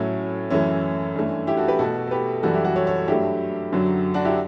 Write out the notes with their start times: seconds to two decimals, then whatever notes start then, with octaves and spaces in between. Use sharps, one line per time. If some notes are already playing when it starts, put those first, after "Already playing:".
Already playing: A2 F#3 A3 C#4 E4
0.50 F#2 E3 A3 C#4 E4
1.15 G2 E3 A3
1.47 E4 G4
1.57 F#4 A4
1.68 G4 B4
1.79 B2 A3 F#4 A4
2.08 A4
2.11 G4 B4
2.43 F#2 E3 G3 F#4 A4
2.54 E4 G4
2.65 F#4 A4
2.76 A4 C#5
2.87 A4 C#5
3.08 G2 F#3 A3 E4 G4
3.72 F#2 D3 F#3
4.14 D4 F#4
4.25 E4 G4